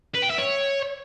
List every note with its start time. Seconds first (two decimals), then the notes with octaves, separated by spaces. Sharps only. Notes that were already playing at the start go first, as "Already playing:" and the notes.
0.14 B4
0.22 G5
0.30 E5
0.38 C#5